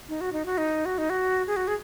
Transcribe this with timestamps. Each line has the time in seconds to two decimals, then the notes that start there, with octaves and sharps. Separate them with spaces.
0.09 D#4
0.21 F#4
0.33 D#4
0.46 F#4
0.58 D#4
0.85 F#4
0.98 D#4
1.10 F#4
1.47 G#4
1.56 F#4
1.68 G#4